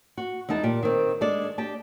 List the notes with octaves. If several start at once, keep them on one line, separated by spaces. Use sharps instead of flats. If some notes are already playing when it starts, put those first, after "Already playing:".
F#4
E2 G#3 D#4 A5
A#2 G4
D#3 C4
G#3 D4 A4 D5
D4 G4 A5